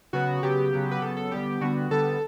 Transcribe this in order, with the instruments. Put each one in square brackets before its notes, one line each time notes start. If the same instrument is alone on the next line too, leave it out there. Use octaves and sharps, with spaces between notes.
[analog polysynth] C#3 F#3 B3 F#4
C#3 F#3 B3 G4
C#3 F#3 B3
B4
C#3 F#3 B3 A4
A4
D3 G3 B3 G4
D3 G3 B3 F#4
D3 G3 B3 A4